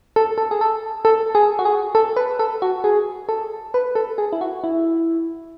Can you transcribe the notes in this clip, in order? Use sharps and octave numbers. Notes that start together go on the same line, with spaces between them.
A4
A4
G#4
A4
A4
G#4
F#4
G#4
A4
B4
A4
F#4
G#4
A4
B4
A4
G#4
E4
F#4
E4